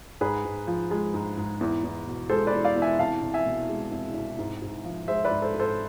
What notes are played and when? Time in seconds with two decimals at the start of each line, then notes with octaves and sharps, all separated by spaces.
0.21 G#2 G#4 B4
0.45 G#2
0.67 F3
0.91 G#3
1.14 G#2
1.37 G#2
1.61 E2
1.84 E2
2.07 B2
2.30 G#3 A4 C5
2.47 B4 D5
2.53 E2
2.65 D5 F5
2.76 E2
2.82 E5 G#5
2.99 C2 F5 A5
3.22 C2
3.34 E5 G#5
3.45 B2
3.69 G#3
3.92 C2
4.15 C2
4.38 G#2
4.62 G#2
4.85 F3
5.08 G#3 C5 E5
5.25 B4 D5
5.31 G#2
5.42 A4 C5
5.54 G#2
5.59 A4 C5